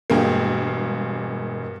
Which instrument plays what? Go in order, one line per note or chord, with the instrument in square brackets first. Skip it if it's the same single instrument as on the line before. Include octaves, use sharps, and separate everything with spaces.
[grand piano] E1 G#3 G5 [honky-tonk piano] G2 A#3